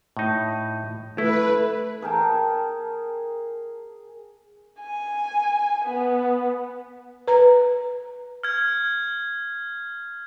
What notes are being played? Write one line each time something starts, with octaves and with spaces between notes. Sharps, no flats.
A2 D#4
A3 E4 B4
G#4 A#4 G5 A5
G#5
B3
B4 A#5
F6 G#6